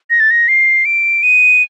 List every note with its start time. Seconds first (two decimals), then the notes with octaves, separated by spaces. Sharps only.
0.10 A#6
0.20 A6
0.31 A#6
0.48 C7
0.85 D7
1.23 D#7